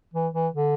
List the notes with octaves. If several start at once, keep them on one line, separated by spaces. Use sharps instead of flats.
E3
E3
D3